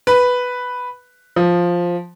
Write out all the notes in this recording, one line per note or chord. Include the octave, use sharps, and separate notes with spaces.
B4
F3